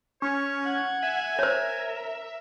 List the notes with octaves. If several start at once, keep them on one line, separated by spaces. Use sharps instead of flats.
C#4 C#5
F#5 G#6
E5 G#5
A#4 C5 C#5